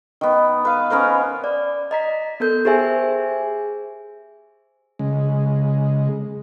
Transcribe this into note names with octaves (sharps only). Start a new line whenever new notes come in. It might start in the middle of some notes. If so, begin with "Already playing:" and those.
D#3 B3
B4 F5
B3 C#4 A#4 C5
D5
D#5 A#5 B6
B3 A4 A#4 G6
G4 G#4 C5 E5 G#5
C#3 G#3